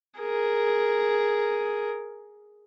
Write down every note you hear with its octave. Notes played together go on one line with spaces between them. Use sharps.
G#4 A#4